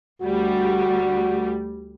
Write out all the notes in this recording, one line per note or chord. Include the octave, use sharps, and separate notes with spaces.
D2 G3 F#4